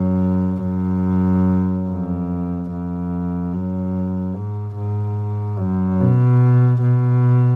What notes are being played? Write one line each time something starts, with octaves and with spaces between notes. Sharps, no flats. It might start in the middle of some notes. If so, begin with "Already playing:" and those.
Already playing: F#2
F#2
F2
F2
F#2
G#2
G#2
F#2
B2
B2